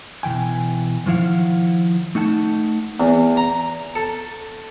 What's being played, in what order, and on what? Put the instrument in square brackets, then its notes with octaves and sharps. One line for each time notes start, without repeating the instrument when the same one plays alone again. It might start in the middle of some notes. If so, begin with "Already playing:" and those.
[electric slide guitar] B2 E3 G5 G#5
D#3 F3 E4 F5 F#5
A3 D#4 F#5 G#5 A5
[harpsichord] E2
A#5
A4